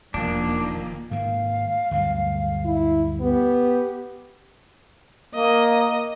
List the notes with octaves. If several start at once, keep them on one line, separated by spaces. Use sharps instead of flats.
E1 F2 A#2 D#3 A#3 D4
G#2 D#3 A#3 F5
D2 G2 F#3
E4
B3 G4
A#3 D#5